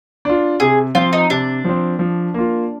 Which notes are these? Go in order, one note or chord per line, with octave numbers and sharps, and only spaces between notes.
D4 F4
C3 G#4
F3 C4 F4
D#4
C3 D4
F3 C4
F3
A#3 F4